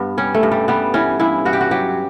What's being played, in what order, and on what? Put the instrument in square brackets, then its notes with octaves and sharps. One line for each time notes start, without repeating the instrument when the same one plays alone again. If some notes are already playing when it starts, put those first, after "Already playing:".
Already playing: [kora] G2 B3
G3 C#4
A3
G2
G3
G3 B3
E3 C#4
G2 E4
G2 F#4
G4
F#4
F#3 G4